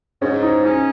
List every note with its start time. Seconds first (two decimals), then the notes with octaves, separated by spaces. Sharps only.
0.21 G#2 C#4
0.43 D#4
0.64 C#4 D#4